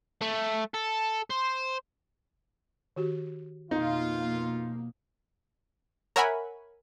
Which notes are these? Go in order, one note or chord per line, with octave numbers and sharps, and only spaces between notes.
A3
A4
C5
D#3 F#4 G4
F2 B2 A#3 D#4 F4
A#4 C#5 E5 F#5 G#5 B5